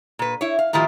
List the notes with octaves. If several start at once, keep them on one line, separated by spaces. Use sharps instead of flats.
A#2 B4
E4 C#5
F5
A2 D#3 F3 E4 F4 G4